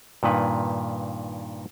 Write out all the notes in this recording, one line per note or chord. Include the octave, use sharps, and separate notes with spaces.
G2 A#2 D#3 B4